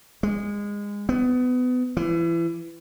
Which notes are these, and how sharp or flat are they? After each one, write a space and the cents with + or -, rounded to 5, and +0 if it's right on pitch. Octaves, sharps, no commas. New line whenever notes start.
G#3 -25
B3 +25
E3 +30